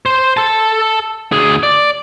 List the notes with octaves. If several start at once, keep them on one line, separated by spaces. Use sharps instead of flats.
C5
A4 A5
D2 G#4
D5